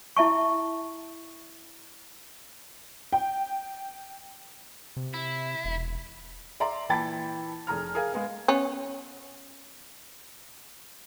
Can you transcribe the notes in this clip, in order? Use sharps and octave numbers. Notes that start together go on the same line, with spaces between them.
E4 E5 A5 C#6
G5
C3
E4
E1
D5 E5 A#5 C6
A#2 E3 G5 A5 B5 A6
F1 G#4 A#5 F6
G#4 A#4 F5 G#5
G#3 B3 F5
B3 C#4